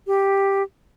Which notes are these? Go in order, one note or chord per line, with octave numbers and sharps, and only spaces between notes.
G4